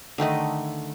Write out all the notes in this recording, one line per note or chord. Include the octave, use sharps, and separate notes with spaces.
D3 D#3 A3 D#5